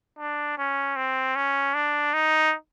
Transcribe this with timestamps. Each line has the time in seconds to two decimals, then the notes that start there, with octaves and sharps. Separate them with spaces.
0.19 D4
0.58 C#4
0.96 C4
1.36 C#4
1.74 D4
2.14 D#4